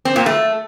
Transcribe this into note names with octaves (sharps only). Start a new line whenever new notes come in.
C4
A#2
A3